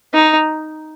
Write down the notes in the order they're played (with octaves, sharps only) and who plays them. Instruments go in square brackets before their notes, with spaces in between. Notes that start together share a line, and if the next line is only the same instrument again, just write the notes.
[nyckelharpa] D#4